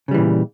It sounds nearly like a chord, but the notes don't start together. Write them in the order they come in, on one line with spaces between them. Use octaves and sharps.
C#3 G3 E3 A#2